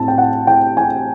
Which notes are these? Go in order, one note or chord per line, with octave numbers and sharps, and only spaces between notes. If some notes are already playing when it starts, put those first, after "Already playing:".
Already playing: A2 C4 A5
G5
F#5
G5
G#5